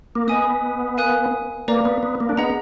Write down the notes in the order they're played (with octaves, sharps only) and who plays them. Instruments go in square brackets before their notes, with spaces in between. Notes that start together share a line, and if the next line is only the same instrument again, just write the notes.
[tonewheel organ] A#3
[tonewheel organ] B3 [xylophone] B4 D#5 G#5 D#6
[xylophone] A#4 F5 G#5 D#6 F#6
[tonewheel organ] A#3 [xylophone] B4 D5 F5 A#5
[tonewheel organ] B3
B3
A#3
D4
[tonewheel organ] B3 [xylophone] G#4 D#5 F#5 A#5